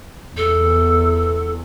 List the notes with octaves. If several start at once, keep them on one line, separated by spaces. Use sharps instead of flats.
E2 A4